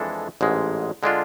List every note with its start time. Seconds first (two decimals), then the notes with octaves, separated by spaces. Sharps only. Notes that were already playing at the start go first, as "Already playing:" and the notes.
Already playing: F2 E3 G#3 D4 A4
0.41 A1 G#2 G#3
1.03 D3 G#3 D4 F4